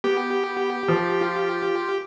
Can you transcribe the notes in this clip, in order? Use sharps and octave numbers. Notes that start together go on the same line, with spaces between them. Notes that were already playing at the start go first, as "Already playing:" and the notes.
B3 G4
F3
F4